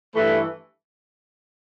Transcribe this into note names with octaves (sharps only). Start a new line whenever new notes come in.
G2 E3 A3 E4 B4